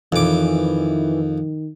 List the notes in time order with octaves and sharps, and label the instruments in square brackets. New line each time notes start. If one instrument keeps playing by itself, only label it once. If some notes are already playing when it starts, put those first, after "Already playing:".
[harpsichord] F2 D6 [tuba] D#3 [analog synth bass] E3